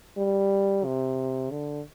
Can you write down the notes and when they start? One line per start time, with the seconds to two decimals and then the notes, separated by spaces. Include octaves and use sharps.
0.18 G3
0.85 C3
1.51 D3